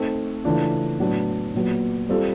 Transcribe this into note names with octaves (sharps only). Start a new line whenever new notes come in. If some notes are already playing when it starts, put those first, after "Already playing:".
Already playing: A3 C4 D#4
C#3 E3 A3 D4 F4
A2 F#3 B3 D4
A#2 F#3 B3
G3 C4 F4 A4